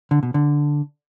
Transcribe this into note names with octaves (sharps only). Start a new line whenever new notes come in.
D3
B2
D3